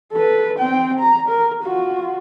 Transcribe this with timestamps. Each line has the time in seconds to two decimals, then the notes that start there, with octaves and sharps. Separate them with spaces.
0.13 A4 B4
0.59 C4 G5
0.99 A#5
1.28 A#4
1.63 F4 F#4